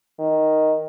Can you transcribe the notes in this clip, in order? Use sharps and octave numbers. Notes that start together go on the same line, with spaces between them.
D#3